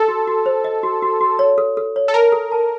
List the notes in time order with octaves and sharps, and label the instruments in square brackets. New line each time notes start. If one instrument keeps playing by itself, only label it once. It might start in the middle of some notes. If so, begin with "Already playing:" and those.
Already playing: [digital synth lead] A4
[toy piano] F#4
F#4
C5
D#5
F#4
F#4
F#4
C#5
A4
A4
C#5
[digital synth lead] A4
[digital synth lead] A#4 [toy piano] A5
[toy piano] A4
A5